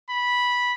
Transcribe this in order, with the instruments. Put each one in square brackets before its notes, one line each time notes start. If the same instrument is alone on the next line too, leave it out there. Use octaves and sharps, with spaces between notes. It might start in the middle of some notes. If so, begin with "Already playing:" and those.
[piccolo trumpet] B5